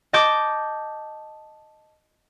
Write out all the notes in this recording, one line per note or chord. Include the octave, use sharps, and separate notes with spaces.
D#5 A5 D6 G6